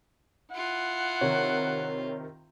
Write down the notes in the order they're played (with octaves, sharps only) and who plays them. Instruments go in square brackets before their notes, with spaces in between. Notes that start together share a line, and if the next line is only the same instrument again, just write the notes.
[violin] E4 F4 [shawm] F#5
[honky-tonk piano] C3 D#3 [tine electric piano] C#5